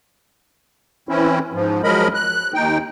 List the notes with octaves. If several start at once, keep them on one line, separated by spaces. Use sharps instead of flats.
E3 C4 C#4 E4
G#2 F3
F3 F#3 G#3 A#4 D#5 B5
F#6
D#2 D#4 G5